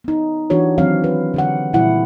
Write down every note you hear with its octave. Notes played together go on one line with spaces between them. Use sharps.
B3 D#4
E3 D4 F#4 G4 C#5
D#3 E3 F#3 C4 C#5 F5
B4
D3 G4 F#5
A#2 E3 G3 E4 F#5